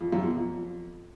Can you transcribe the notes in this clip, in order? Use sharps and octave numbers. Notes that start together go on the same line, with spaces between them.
F2
F#2
B2
F2